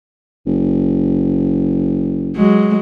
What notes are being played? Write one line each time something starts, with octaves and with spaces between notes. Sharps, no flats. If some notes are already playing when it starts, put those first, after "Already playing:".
F#1
F#3 G#3